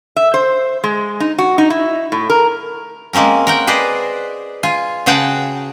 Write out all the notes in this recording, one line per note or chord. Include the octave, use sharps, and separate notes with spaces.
E5
C5
G#3
D#4
F#4
D#4
E4
A2
A#4
G#3 A#3 C4 C#4 A#4
A#4 F#5 G5
G#4 B4 C5 D5 D#5
F4 G#5
C#3 F#4 G#4 F#5 G5 A5